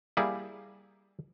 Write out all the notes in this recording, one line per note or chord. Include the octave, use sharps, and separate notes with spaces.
G3 A#3 E4 G#4